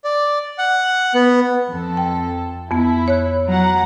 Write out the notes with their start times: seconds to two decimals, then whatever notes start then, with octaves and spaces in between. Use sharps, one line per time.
0.04 D5
0.58 F#5
1.14 B3
1.69 F2 A4
1.97 G5
2.71 F2 B3 E4
3.08 C#5 F#6
3.49 F#3 F#5 A#5